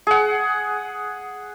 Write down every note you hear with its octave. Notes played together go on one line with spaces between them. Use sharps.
G#4 F#5